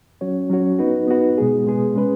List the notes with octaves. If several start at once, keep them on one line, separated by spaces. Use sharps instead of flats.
F#3 C#4 F#4 C#5
F#3 C#4 F#4 C#5
B3 D#4 F#4 B4
B3 D#4 F#4 B4
B2 G#3 B3 G#4
B2 G#3 B3 G#4
G#3 C#4 B4